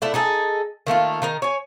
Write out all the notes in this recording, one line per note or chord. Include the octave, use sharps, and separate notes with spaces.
A3 D4 E4
D#4 G#4 A4
D#3 A3 A#3 F4
D#3 D#4 A#4
C#5 G#5